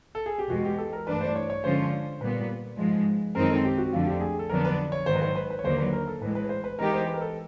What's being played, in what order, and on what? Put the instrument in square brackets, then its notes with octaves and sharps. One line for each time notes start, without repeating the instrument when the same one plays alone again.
[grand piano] A4
G#4
G4
[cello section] E2 B2 G#3 [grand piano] F#4
[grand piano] G4
A4
A#4
[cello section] G2 E3 A3 D4 [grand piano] B4
[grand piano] C5
C#5
C#5
[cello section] D3 F3 G#3 C#4 F4 [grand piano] C5
[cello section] A#2 G3 B3 [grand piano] B4
[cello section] G#2 F3 G#3
[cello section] F#2 D#3 G#3 C4 D#4 [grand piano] A#4
[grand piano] A4
G4
F#4
[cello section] F2 D3 F3 A3 [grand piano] F4
[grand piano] G4
G#4
A4
[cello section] F2 D3 F#3 B3 D4 [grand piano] A#4
[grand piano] B4
C#5
[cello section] G#2 D#3 F#3 [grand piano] C5
[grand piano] B4
C5
B4
B4
C#5
[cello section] D#2 D3 F#3 A#3 [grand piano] C5
[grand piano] B4
A#4
A4
[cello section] A2 E3 G#3 [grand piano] B4
[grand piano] B4
C5
B4
[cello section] E3 G#3 B3 D#4 G4 [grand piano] A#4
[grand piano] C5
B4
A#4
A4